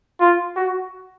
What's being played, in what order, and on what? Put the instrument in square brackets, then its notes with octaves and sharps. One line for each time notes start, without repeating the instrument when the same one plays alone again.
[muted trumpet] F4
F#4